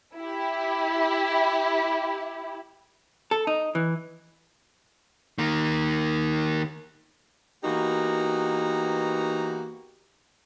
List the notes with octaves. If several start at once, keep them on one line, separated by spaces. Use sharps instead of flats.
E4 G4
A4
D#4
E3
D#3 A#3
E3 A#3 B3 D#4 F#4 G4